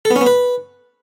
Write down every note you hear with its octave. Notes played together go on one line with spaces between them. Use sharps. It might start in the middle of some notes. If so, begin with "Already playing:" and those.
A4
B3
C#4
B3
B4